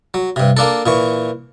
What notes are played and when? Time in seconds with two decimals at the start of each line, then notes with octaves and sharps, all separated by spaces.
0.14 F#3
0.36 G2 C3
0.57 A#3 D4 A4
0.86 A#2 E3 C#6